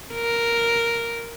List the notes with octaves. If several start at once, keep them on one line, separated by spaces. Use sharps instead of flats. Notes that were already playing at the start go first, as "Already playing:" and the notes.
A#4